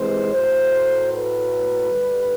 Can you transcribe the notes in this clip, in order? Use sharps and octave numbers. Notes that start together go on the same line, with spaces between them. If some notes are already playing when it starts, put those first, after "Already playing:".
Already playing: C3 E3 G#3 C5
A2 F#3 A3 C5
B4
G2 D3 G3